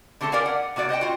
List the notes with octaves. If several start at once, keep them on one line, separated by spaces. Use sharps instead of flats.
D3 A3 C4 G#4 A4
G4 A#4 D5 F5 G#5
F#5
C3 A#3 F#4 D5
C5 D#5 F#5 G5
F4 F#4